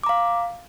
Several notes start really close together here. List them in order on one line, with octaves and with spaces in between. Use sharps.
D6 A#5 F5